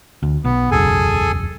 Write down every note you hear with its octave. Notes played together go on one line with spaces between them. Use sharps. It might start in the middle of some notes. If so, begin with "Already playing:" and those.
D2
B1 B3
E1 C#2 F#2 G#4 A4 G#5